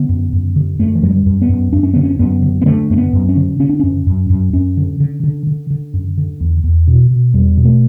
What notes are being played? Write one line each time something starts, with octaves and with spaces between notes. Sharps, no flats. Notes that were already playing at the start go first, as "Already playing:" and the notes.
Already playing: D3 B3
F#2
F#2
D3
F#2 A3
E3
F#2 F#3
G3
F#2
B3
F#2
F#2 D4
C#4
D3 B3
C#4
F#2 B3
D3
B3
D3 A3
F#2 A3
B3
F#2
C#4
D3
D3 C#4
D4
F#2 C#4
F#2
F#2
F#2 C#4
D3
D3
D3
D3
D3
F#2
D3
E2
E2
B2
B2
E2 G3
B2
A3